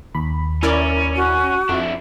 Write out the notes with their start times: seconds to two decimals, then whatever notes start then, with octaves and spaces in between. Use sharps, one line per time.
0.15 D#2 B5
0.63 C#4 E4 A#4 D5
1.16 F#4
1.69 F2 D4 E4